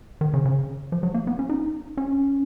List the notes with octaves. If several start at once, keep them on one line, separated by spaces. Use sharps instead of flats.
D#3
C#3
C#3
F3
F#3
A#3
B3
C#4
D#4
C#4